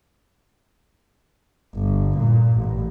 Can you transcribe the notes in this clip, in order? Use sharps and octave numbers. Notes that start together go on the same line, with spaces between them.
G1
A#2
A1